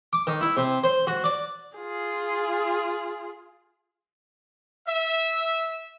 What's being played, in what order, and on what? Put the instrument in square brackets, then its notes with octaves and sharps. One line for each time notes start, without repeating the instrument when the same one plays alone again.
[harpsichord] D6
D#3
E4
C3
C5
F#4
D5
[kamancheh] F4 G#4
[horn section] E5